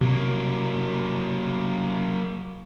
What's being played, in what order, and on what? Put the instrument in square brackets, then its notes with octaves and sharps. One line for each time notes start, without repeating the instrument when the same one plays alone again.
[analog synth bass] C3 [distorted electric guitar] F#3 A#3